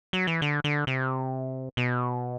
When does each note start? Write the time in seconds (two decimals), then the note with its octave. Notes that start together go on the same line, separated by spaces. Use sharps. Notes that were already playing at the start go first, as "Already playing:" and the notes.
0.13 F#3
0.27 E3
0.42 D3
0.64 D3
0.87 C3
1.77 B2